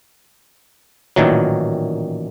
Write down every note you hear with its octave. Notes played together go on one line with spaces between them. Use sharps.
A1 A#2 D#3 E3 F#3